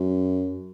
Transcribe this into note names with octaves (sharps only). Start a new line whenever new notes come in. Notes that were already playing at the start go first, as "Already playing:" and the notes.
Already playing: F#2